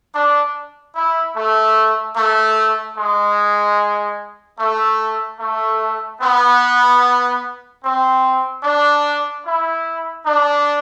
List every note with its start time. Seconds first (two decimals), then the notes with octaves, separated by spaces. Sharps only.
0.14 D4
0.95 E4
1.36 A3
2.16 A3
2.98 G#3
4.59 A3
5.40 A3
6.22 B3
7.84 C4
8.64 D4
9.46 E4
10.26 D4